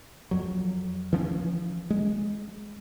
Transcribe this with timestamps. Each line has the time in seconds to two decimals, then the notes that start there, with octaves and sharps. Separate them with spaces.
0.31 F2 F#3
1.13 E3 F3 C#4
1.90 G#3